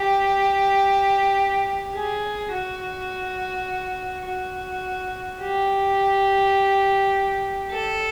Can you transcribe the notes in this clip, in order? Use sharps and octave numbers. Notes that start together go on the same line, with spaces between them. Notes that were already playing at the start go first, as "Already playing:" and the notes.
Already playing: G4
G#4
F#4
F#4
G4
A4